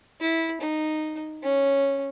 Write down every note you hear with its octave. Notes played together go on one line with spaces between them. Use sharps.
E4
D#4
C#4